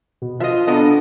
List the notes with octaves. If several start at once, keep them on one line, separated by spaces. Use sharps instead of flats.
B2
F3 F4 D#5 E5
C3 B3 D4 A4 D#5